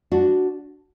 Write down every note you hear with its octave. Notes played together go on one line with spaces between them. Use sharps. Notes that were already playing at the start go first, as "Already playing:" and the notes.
D4 F#4